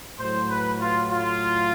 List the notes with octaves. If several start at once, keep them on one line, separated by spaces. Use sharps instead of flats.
A2 F#3 C5
B4
F4
F4